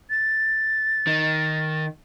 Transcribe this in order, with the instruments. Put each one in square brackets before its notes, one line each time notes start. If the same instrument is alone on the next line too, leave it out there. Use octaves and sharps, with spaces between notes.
[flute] A6
[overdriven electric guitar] D#3